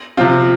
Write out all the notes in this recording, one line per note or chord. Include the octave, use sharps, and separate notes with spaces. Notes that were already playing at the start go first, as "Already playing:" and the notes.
C3 F3 C4 F4